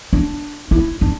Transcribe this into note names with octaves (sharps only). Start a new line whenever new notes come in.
D4
E4
D4